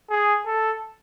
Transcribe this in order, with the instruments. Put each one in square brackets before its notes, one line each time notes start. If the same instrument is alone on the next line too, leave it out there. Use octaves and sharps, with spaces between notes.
[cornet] G#4
A4